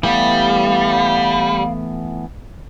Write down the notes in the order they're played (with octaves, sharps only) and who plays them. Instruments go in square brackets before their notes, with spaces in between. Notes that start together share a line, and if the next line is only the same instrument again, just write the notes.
[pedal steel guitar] E3 A3 B3 [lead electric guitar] G3 [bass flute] F5